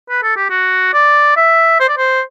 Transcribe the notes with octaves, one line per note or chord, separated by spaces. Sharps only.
B4
A4
G4
F#4
D5
E5
C5
D5
C5